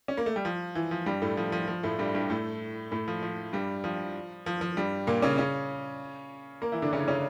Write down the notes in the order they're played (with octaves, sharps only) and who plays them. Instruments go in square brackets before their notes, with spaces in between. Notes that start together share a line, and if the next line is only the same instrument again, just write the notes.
[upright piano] C#4
A#3
A3
G3
F3
E3
F3
G2 G3
A2 A3
F3
F3
F3
A2 A3
G2 G3
G2 G3
A2 A3
A2 A3
F3
F3
G2 G3
F3
F3
F3
G2 G3
A#2 A#3
C#3 C#4
C#3 C#4
A#3 A#4
E3 E4
D3 D4
C#3 C#4
C#3 C#4